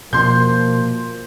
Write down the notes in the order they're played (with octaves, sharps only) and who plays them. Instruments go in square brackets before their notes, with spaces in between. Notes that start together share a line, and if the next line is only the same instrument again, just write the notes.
[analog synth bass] B2 [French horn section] F3 A#3 [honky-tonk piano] C6 G6